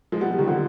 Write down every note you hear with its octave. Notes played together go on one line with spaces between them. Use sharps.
F3 G#3
G3 B3
F3
D#3 G3
D3 F3